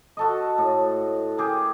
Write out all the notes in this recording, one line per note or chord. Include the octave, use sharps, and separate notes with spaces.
F#4 A4 D#5
A2
G4 G#4 A#4